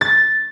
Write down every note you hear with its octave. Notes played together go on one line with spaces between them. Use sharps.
A6